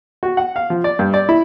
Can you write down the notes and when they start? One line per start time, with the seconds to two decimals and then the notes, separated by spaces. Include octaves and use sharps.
0.23 F#4
0.37 F#5
0.56 F5
0.70 F3
0.84 D5
0.99 G2
1.14 D5
1.29 E4